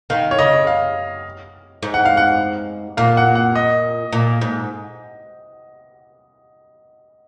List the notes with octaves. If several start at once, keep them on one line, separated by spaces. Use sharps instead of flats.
D#3 F5
C#5
C#3 D#5
F5
G#2
F#5
F5
F#5
A#2 F5
F#5
F#5
D#5
A#2
G#2